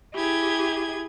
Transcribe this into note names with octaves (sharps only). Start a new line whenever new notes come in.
E4 G4 G#4 G#6